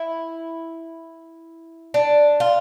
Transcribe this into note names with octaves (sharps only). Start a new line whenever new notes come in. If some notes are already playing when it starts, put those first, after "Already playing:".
Already playing: E4
D4
F4